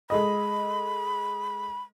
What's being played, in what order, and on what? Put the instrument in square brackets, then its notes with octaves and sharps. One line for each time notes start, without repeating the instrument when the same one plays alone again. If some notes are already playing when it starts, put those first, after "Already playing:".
[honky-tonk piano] G#3 A4 D#5 [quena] B5